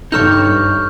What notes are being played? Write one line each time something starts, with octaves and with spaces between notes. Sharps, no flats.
G2 D#4 A4 C#5 C#6 F6 G6